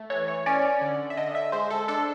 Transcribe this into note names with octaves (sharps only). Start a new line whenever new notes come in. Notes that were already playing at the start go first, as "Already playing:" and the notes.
Already playing: A3
E3 C#5
C#5
C#4 D5
D3
E5
D3 D#5
E5
G#3 C5
A4
D4 A4